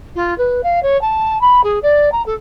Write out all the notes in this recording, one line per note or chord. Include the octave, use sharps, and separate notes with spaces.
F4
B4
F5
C#5
A5
B5
G#4
D5
A#5
A4